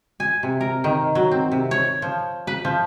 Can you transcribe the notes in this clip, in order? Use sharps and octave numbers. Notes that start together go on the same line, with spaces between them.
G#5
C3
A#4
D#3
F#3
C4
C3
C#5
F3
B4
F3